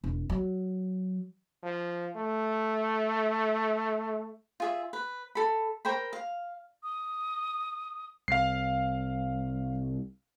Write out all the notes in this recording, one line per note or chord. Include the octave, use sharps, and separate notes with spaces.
E1
F#3
F3
A3
F4 G#4 E5
B4
A4 B5
A#4 C5 G5 B5
F5
D#6
C2 F5 C7